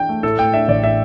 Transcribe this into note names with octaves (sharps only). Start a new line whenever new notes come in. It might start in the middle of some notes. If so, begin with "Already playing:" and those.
Already playing: E3 D4 G5
A3
A2 A4
A3 G5
D4 E5
A1 D5
A2 E5